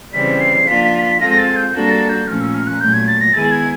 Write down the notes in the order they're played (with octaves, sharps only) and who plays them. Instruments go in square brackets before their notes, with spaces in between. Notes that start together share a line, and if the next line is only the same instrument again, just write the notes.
[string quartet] C#3 E3 G3 C4 [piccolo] B6
[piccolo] C7
[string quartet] F3 A#3 D4 F4 [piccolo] B6
[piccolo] B6
B6
[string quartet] G#3 C4 F4 A4 [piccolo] A#6
[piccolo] A#6
A6
G6
[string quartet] G3 A#3 D4 F#4 A4
[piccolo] A#6
A6
G6
[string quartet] A#2 F3 A3 C#4 [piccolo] F6
[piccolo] E6
F6
F#6
[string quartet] A#2 F#3 A3 [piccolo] G6
[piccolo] G#6
A6
A#6
[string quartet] D#3 G#3 B3 E4 G#4 [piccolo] A6
[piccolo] G#6